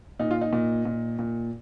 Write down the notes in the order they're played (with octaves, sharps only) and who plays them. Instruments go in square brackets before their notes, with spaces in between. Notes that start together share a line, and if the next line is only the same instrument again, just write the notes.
[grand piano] A#2 [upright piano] D#4
[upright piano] F4
D#4
[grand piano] A#2
A#2
A#2